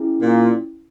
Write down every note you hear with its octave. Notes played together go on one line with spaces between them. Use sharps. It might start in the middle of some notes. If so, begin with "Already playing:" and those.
Already playing: C#4 E4 G#4
A#2